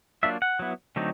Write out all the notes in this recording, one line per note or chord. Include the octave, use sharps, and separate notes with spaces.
F#3 A#3 D4 F4 E5
F#5
F#3 B3 E4
D3 F#3 A3 C4 D#4